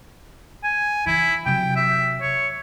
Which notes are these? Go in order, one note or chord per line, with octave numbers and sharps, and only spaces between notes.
G#5
E3 E4
C3 F#3 G5
E5
C#5